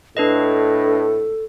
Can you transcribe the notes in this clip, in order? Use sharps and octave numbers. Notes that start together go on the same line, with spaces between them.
A2 D4 A4 B4 D#5